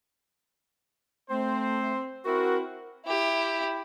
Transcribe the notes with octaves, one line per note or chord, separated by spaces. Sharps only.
A3 C4 C5
C4 E4 F#4 A#4
E4 G4